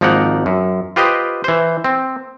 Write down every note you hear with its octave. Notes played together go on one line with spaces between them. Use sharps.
G#1 F3 A#3 D#4 A#4 F#5
F#2
F4 G4 B4 C5 D#5 G5
E3 C5
C4